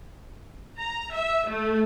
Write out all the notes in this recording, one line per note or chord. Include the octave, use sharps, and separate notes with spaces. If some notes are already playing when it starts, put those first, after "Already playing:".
A#5
E5
A3